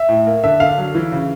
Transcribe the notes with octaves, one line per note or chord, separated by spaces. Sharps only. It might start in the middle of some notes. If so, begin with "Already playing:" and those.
Already playing: E5
A2
A#3
D3 E5
D3 F5
F#3
E3
C#3